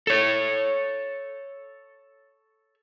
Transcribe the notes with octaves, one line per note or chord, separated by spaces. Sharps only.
A4 C#5